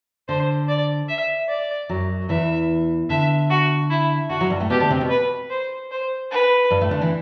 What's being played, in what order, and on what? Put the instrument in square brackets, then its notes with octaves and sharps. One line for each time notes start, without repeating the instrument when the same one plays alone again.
[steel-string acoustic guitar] D3 [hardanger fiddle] C5
[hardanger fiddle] D5
E5
D5
[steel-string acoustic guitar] F#2 F#3
[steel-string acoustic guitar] E2 E3 [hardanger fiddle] E5
[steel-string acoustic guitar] D3 [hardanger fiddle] E5
[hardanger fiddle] F#4
E4
[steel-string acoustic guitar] D3 [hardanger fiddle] F#4
[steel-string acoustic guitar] F#2 F#3
G2 G3
A2 A3
[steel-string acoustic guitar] B2 B3 [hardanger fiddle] G4
[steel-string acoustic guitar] D3 D4
C3 C4
B2 B3
[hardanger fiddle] B4
C5
C5
B4
[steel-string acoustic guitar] G2 G3
A2 A3
D3 D4
E3 E4